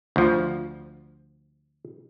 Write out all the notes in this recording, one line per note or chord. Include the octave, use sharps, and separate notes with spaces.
D2 F3